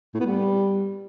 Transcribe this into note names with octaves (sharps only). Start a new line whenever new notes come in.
A2
B3
G3